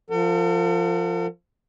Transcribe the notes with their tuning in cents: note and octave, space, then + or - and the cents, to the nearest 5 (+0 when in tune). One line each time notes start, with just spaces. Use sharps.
F3 -10 A4 +45 F#5 +0